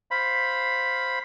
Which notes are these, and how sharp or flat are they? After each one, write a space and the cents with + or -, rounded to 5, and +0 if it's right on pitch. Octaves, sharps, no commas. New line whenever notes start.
C5 +0 F5 +0 B5 +0